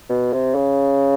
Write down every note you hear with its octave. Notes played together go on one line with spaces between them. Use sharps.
B2
C3
C#3